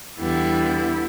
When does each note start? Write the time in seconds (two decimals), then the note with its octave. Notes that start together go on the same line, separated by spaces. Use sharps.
0.18 E2 D3 G3 B3 E4